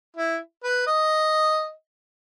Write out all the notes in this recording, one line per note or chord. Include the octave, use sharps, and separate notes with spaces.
E4
B4
D#5